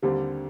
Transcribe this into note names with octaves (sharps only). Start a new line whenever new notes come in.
D#2 D3 G3 C4 G4